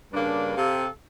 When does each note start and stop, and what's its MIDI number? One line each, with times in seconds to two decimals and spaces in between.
0.13 0.52 43
0.13 0.52 49
0.13 0.52 58
0.13 0.52 62
0.57 0.88 48
0.57 0.88 67
0.57 0.88 69
0.57 0.88 77